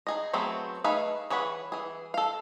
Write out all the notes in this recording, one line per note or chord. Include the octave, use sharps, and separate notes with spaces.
D#4 G#4 D#5
F#3 A3 B3 C4 G#4
A3 D#4 G#4 B4 F5
E3 G#4 C#5 F#5 B5
E3 G#4
A4 F5